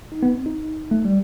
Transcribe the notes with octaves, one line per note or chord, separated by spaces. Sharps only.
D#4
B3
C4
D#4
A3
G3